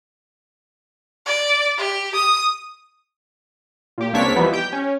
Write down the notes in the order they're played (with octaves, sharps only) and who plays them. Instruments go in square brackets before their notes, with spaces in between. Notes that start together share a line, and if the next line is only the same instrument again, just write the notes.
[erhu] D5
G4
D#6
[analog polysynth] A#2 G4
C#2 A#3 C4 D4 C#5 B6
E3 F3 G3 B3 D#4 E4
G4 G5
C#4